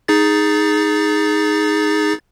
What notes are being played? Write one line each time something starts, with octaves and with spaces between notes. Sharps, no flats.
D#4 G#4 A6